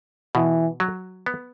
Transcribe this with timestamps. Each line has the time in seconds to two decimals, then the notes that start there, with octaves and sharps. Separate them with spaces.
0.35 B2 E3
0.80 F#3
1.26 B3